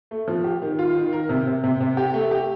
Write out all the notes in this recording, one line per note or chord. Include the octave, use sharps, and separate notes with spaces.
A3
F3
G4
D#3
F4
D#3
A#4
C3
C3
C3
C3
G4
A3
G4